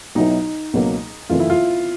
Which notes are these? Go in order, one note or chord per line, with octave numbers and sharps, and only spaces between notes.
B1 B2 F#3 B3 D#4 E4
C#2 B2 F#3 A#3
F#1 F2 C3 E3 A3 F4
E4
F4